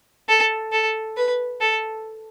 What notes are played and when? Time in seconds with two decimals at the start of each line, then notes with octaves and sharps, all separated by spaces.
0.29 A4
0.73 A4
1.17 B4
1.61 A4